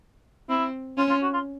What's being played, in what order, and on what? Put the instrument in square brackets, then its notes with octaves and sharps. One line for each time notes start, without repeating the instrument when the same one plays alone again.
[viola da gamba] C4 [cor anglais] E4
[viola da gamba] C#4 [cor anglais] F4
[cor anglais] F4
F#4
F4